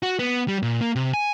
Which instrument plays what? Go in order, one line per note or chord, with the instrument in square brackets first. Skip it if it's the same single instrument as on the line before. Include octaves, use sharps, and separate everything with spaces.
[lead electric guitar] F#4
B3
G3
A#2
A#3
C3
G#5